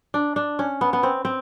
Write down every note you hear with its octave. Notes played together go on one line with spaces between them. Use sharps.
D4
D4
C#4
B3
B3
C4
C4